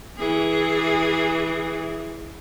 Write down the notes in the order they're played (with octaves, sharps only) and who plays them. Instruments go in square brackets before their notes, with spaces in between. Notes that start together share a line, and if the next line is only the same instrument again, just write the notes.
[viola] E3 G#4